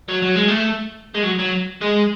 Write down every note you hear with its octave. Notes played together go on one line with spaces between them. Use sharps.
F#3
F#3
G#3
A3
G#3
F#3
F#3
G#3